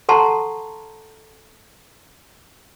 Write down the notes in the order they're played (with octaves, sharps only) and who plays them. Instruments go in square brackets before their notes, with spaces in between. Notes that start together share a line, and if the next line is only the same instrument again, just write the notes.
[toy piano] A4 F#5 A5 A#5 C6 C#6